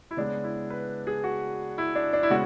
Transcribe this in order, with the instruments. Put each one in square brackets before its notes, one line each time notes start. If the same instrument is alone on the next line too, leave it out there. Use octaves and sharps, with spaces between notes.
[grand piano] E4
C#3 G#3 B3 D4
E4
B4
G#4
F#4
E4
D4
D4
E4
C#3 G#3 B3 F#4